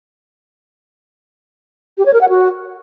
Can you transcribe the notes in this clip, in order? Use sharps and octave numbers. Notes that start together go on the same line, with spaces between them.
G4
C#5
A#4
F#5
F#4